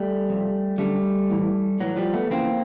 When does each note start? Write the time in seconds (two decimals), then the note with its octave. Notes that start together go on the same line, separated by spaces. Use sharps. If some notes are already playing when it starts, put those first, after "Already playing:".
Already playing: G3 A3
0.29 F2 C3
0.78 F#2 D3 G3 A3
1.30 A2 E3
1.80 A2 E3 F#3
1.96 F3 G3
2.13 A3 B3
2.30 F2 C#3 E3 A#3 C4